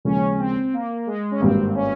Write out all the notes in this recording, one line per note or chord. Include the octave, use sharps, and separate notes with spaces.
D#2 C#3 F3 G#3 C#4
C4
A#3
G#3
C#4
G#1 G2 G3 A#3 C4
C#4